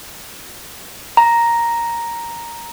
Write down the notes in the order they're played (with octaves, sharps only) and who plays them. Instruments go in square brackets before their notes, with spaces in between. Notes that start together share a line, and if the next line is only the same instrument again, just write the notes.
[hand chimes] A#5